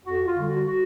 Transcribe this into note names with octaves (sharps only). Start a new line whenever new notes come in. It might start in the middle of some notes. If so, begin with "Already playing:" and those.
F2 F#4
F4
D3 G3
F#4
F#4